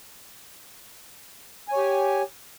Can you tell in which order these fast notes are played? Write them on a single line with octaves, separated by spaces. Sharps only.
G#5 C#5 G4